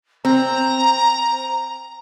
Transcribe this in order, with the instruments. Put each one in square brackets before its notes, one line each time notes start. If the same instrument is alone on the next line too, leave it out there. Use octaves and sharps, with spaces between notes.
[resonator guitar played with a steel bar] C4 [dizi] A#5